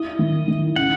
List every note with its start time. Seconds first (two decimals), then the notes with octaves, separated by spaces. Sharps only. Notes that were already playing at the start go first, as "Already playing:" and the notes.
Already playing: E4 D#5
0.19 D#3
0.48 D#3
0.76 C#3 F#5